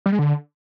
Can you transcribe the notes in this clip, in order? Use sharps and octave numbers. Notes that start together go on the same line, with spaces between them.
G3
G#3
D3